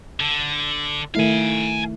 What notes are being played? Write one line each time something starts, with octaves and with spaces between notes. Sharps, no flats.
D3
D#3 A3 E4 F5 G#5